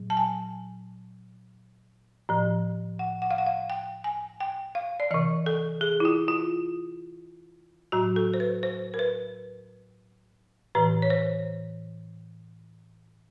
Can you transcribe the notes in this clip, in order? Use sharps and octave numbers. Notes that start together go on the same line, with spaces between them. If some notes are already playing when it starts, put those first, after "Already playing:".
Already playing: A#2 F#3
A5
G#5
A2 F3
F#5
F#5
F5
F#5
F5
G5
G#5
G5
F5
D5
C3 E3 D#5
A4
G#4
E4
F4
F4
A2 F#3 F#4
A4
C5
B4
C5
A#4
B4
A2 E3 B4
C#5
C5